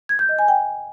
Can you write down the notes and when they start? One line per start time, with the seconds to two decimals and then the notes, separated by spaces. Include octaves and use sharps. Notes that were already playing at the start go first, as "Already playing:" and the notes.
0.09 G#6
0.19 G6
0.29 D#5
0.39 G#5
0.48 G5